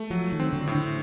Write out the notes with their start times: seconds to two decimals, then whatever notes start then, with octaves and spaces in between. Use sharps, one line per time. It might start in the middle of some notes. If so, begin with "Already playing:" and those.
Already playing: A3
0.10 F3 F#3
0.32 D#3
0.40 C4
0.53 D3
0.67 A2
0.75 D3